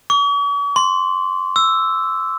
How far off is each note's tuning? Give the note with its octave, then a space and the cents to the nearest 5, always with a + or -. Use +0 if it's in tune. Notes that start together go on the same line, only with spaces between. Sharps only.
C#6 +45
C6 +0
E6 +0